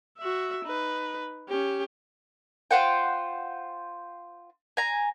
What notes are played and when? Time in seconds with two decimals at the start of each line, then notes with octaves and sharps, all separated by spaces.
0.18 F#4 E5
0.65 D#4 B4
1.49 C#4 G4
2.71 F4 C5 F#5 G5
4.77 G#5 A#5